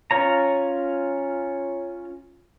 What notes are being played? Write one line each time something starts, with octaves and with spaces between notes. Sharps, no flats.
C#4 F4 C#5 A#5